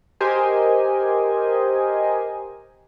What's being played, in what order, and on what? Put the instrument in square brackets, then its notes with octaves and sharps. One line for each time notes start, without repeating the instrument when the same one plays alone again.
[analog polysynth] G4 A#4 C5 D#5 G#5